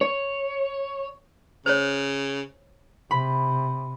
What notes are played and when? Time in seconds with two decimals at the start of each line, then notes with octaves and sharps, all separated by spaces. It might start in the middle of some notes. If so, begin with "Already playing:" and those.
0.01 C#5
1.66 C#3 C5 C#5
3.11 C3 B5